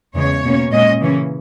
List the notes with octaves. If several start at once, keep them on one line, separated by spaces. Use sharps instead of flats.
E2 C#3 G#3 C#5
B2 A#3 C#4
A#2 G#3 C#4 D#5
C#3 E3 A#3 C#4